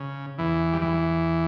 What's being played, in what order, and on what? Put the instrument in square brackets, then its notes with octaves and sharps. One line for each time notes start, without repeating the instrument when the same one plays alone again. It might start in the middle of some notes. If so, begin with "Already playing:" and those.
Already playing: [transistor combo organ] C#3
E2 E3
G3
E2 E3